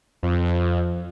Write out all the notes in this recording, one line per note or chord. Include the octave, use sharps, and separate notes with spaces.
F2 F3